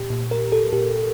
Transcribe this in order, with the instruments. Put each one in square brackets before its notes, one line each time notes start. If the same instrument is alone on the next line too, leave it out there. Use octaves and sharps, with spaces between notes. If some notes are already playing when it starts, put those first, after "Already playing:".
Already playing: [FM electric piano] A#2 G4
A#2
A#4
A4
A#2 G4